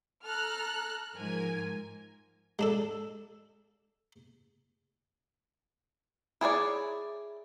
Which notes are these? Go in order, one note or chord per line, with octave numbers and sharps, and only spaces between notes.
A4 A#5 F6 F#6
G#2 F3 A#4 G#5
G#3 D4 A4
E4 G#4 C#5 D5